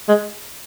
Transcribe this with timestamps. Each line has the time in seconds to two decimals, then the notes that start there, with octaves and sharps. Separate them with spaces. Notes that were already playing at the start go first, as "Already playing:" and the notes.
0.09 G#3